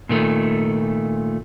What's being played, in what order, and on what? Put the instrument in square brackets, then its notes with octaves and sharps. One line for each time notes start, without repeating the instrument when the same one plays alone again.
[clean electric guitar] A#2 D#3 A3